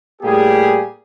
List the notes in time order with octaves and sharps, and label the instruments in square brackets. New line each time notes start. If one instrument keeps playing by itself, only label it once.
[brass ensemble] A2 G3 A#3 G4 G#4